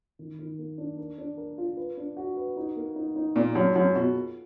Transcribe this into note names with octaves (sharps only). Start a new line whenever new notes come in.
D#3
D#3
A#3
D4
A#4
D4
A#4
F4
B4
D4
F#4
B4
D#4
A#3
D#4
D#4
A#2 G#4
F#2 G#4
F#2 G#4
B2 F4
A#3